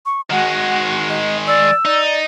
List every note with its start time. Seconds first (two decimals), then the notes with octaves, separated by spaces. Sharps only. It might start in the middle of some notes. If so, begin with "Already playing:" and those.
0.06 C#6
0.30 D#3 G#3 F#4 F#5
1.09 D#5
1.47 D5 E6
1.85 D#4 D5